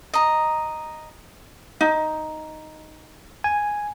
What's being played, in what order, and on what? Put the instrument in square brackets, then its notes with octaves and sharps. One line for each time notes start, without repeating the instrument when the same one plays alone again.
[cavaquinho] D#5 A#5
[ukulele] D#4
[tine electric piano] G#5